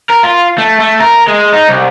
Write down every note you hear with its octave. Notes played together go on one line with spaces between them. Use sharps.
A#4
F4
A3
A3
A#4
G#3
D#4
C2